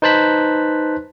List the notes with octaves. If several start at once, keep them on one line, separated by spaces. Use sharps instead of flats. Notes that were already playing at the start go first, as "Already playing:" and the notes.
D#4 B4 C5 A5 F#6 B6